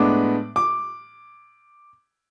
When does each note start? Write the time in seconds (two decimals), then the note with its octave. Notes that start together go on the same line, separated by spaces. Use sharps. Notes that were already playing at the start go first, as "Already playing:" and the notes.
Already playing: A2 G#3 B3 D4 D6
0.56 D6